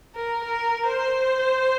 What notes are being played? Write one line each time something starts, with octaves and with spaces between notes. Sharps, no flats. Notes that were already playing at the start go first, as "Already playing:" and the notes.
A#4
A#4
C5